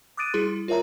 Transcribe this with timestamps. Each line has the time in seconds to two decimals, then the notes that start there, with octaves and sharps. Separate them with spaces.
0.17 D6 D#6 F#6 A6 D7 D#7
0.34 G3 E4 G#4 C6
0.68 F4 A#4 C#5 E5 A5 A#5